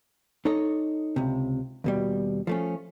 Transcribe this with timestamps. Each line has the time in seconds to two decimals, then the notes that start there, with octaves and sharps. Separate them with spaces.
0.45 D#4 A4 C#5 D#5
1.16 C#2 C3
1.84 D#2 B2 G3
2.47 F3 A3 C#4